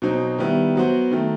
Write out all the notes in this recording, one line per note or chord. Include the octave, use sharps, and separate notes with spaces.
B2 F#3 C4 D#4
D#3 G3 B3 E4
F#3 B3 F#4 C5
D#3 F#3 A3